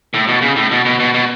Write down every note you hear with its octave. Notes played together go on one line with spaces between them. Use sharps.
A2
B2
C#3
A2
B2
B2
B2
B2